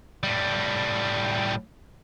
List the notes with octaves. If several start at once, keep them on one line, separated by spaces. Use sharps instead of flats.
A2 G3